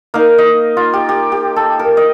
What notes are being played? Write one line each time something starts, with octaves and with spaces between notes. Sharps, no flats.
A#3 D#4 F5
D#5
F4
G4
G4
G4
A4
A#4
D#5